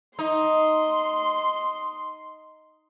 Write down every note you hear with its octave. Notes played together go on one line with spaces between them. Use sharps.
D#4 C6